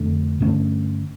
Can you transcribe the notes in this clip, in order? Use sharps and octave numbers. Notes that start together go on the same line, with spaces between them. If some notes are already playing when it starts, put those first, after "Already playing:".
Already playing: F2 D3 A3
G2 D3 A3 C#4